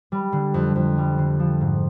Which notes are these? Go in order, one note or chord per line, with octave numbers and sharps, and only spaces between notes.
G3
D3
F2
F2
G3
D3
F3
G#2